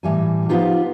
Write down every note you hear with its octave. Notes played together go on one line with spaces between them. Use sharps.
A2 E3 G3 G#5
F3 G#3 B3 D#4 F4 G4